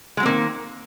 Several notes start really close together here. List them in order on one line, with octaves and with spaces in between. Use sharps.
G#3 F#3 C4 A#3 D#3